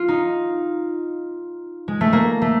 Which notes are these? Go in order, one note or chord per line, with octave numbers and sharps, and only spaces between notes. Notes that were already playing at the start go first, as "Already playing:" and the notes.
Already playing: F4
D#4
G#3
A3
A#3
A3